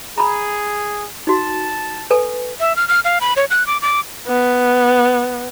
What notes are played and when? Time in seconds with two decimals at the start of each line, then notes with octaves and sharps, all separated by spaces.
0.18 G#4 A#5 B5
1.27 D#4 F#4 A5
2.10 A4 B4 G#5
2.59 E5
2.76 F6
2.88 F6
3.04 F5
3.21 B5
3.36 C#5
3.50 F#6
3.67 D6
3.82 D6
4.27 B3